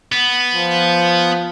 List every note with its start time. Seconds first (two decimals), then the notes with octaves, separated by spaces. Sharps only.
0.12 B3
0.54 F3